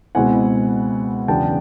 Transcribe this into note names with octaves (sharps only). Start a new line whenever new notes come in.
C#2 B2 G#3 C4 E4 F#5 G#5
E2 C#3 F#3 B3 D4 G5 A5